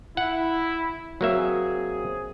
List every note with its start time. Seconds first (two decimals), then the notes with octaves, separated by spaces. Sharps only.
0.17 E4 F#5
1.21 F#3 A#3 C4 G#4 E5